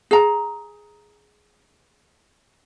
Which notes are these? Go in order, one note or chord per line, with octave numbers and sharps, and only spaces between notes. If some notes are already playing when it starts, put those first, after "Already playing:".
G#4 A#5